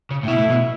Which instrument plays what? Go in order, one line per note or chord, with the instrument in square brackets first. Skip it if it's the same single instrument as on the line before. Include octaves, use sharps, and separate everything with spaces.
[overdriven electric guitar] C#3
A2
[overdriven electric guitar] B2 [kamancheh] E4
[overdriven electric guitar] A2
B2